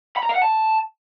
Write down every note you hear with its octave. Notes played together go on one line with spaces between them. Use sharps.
B5
A#5
F5
F#5
A5